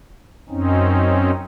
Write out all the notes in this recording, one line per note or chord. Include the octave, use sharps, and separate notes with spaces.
F#2 C4 C#4 D#4